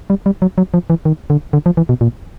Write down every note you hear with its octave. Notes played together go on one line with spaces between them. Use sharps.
G3
G3
F#3
F#3
F3
E3
D#3
D3
D3
F3
E3
B2
A#2